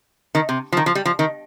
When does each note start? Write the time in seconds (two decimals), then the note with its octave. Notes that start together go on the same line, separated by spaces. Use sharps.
0.35 D#3
0.49 C3
0.72 F3
0.77 D#3
0.86 F3
0.95 G3
1.05 F3
1.19 D#3